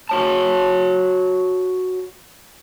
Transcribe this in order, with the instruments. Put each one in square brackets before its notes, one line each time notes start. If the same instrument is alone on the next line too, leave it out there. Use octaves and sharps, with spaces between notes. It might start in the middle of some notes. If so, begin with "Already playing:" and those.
[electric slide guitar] F#4 C#5 A5